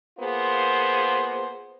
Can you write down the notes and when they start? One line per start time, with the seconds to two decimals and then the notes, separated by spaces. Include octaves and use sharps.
0.19 A#3 B3 F4 G#4 C5